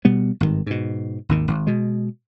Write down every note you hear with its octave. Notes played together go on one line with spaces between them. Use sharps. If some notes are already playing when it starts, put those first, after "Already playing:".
B2 G3 B3
G#1 G2 C3 D#3
G#2 B2
G#1 D#2 D#3
G#1
B2 G#3